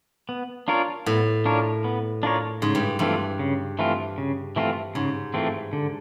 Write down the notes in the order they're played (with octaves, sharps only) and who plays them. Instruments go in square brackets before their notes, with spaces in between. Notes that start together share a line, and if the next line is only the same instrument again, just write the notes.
[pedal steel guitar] B3
D4 F4 A#4 C#5
[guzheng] A2 [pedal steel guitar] B3
[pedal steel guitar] D4 F4 A#4 C#5
B3
D4 F4 A#4 C#5
[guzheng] G#2 [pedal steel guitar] C#3
[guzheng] G2
[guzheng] G2 [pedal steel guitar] E3 A3 C4 F4
[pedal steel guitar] C#3
E3 A3 C4 F4
C#3
E3 A3 C4 F4
[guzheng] G#2 [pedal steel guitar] C#3
[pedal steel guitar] E3 A3 C4 F4
D3